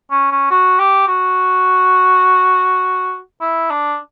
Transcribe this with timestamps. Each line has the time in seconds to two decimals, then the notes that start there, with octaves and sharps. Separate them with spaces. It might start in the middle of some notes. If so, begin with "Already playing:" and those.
0.11 C#4
0.31 C#4
0.50 F#4
0.79 G4
1.08 F#4
3.41 E4
3.70 D4